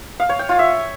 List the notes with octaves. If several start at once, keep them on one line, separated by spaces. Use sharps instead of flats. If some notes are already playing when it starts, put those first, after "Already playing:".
F5
C#5
G5
F4
E5